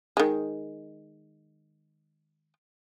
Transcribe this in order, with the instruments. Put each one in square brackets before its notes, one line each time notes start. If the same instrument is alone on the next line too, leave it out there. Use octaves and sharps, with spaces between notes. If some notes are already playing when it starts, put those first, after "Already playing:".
[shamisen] D#3 G#3